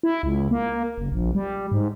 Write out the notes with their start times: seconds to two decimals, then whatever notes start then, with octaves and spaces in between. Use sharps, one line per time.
0.03 E4
0.23 C#2
0.51 A#3
0.98 F#1
1.12 A#1
1.35 G3
1.72 G#2